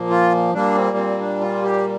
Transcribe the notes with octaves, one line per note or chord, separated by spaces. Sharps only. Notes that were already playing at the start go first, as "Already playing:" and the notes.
Already playing: A#2 F3 A#3
F4
A#2 G3 A#3 D4
C4
C4
D4
F4
G4